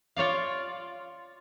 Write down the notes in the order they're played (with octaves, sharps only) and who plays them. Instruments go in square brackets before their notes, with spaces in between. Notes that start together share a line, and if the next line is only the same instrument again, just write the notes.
[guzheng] F4 C#5 D5 F5